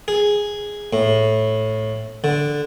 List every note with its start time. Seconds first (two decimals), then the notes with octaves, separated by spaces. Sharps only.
0.08 G#4
0.93 A2
2.24 D3